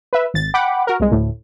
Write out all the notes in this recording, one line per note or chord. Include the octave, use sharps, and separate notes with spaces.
B4 E5
G#1 A6
F#5 G5 B5 D6
F#4 A#4
C2 G#3
D2 A2